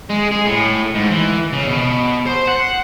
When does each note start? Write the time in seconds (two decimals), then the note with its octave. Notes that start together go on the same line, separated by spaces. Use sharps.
0.10 G#3
0.32 G#4
0.46 A2
0.95 G#2
1.11 E3
1.53 C#3
1.69 B2
2.26 C5
2.47 F#5